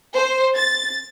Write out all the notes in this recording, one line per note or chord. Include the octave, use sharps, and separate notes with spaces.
C5
A6